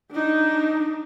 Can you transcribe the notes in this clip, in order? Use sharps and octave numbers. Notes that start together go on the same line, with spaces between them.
D4 D#4